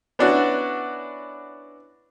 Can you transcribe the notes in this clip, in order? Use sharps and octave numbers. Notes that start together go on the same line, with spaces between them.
B3 C#4 D4 E4 F#4